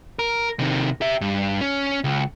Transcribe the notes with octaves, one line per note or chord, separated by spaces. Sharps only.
A#4
C3 D#3
G4 E5
G2
C#4
C#2